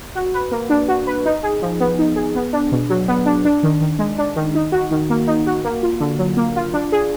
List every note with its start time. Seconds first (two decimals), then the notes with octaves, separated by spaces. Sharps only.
0.16 F#4
0.34 B4
0.51 A#3
0.70 D4
0.88 F#4
1.07 B4
1.25 D#4
1.43 G#4
1.62 F3
1.80 B3
1.99 D#4
2.16 G#4
2.35 B3
2.53 D4
2.72 B2
2.90 F#3
3.08 B3
3.26 D4
3.45 D4
3.63 D#3
3.81 D#3
3.99 G#3
4.18 D4
4.36 D#3
4.55 D#4
4.72 F#4
4.91 D#3
5.10 A#3
5.27 D#4
5.46 F#4
5.64 A#3
5.83 F4
6.00 D3
6.18 F#3
6.37 A#3
6.56 F4
6.74 D4
6.92 G#4